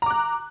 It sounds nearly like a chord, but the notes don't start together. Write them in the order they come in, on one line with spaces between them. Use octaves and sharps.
A#5 D6 F#6